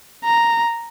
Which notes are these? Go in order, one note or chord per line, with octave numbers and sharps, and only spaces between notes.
A#5